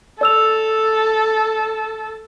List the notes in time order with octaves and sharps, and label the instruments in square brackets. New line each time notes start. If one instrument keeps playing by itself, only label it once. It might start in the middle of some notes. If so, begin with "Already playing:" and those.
[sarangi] A4 [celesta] D5 E6 F7